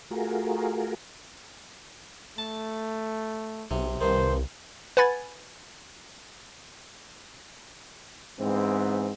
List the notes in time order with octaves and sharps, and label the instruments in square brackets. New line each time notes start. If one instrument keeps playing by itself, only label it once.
[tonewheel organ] A3 F4 F#4 G#4 A#4
[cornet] A3 [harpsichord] A5
[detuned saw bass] B1 [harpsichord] C3
[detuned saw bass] C2 [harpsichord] G2 D#3 [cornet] C5
[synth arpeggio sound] B4 F#5 G#5 B5 G#6 A6
[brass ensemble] G#2 E3 G#3 B3 C4